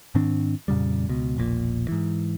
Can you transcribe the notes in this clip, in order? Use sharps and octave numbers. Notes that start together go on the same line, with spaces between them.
G#2 D#3 C4 D4
F2 A#2 C#3 G3
C#2 B2
E1 A#1 A#2
G#2 E3